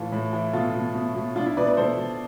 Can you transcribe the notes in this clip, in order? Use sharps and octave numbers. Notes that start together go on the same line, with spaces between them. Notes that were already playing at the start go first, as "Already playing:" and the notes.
Already playing: A2 E3 F4 A4
A2
E3
B2 F4 A4
B2
B2
B2
B2 D4 F4
E4
B2 B4 D5
B4 D5
B2 A4 C5
B2